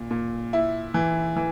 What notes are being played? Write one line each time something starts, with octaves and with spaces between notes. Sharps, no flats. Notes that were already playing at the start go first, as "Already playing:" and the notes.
Already playing: A#2
A#2
E4
E3
E3